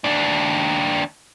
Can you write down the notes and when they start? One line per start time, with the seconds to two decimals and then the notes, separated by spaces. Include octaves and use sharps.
0.04 D#2 D4